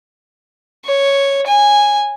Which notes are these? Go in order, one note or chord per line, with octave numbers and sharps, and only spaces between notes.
C#5
G#5